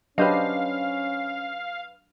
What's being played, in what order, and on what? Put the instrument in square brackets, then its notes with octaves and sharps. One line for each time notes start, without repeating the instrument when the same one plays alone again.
[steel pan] F#3 D4 G4 [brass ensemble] C#4 [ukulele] B4 C5 D#5 [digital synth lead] F5